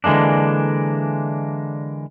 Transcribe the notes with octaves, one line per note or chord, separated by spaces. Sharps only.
D3 E3 G#3 A#3 D4